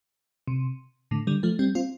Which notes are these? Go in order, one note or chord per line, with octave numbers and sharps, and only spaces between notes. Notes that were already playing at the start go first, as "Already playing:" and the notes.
C3
A2 D3
D3 G3
F3 A3
G3 C4
C4 F4